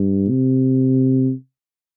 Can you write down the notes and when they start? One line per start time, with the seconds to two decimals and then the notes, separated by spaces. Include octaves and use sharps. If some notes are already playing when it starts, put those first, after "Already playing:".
Already playing: G2
0.30 C3